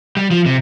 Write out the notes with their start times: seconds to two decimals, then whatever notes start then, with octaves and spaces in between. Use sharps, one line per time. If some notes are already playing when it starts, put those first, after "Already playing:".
0.17 G3
0.31 F3
0.46 C3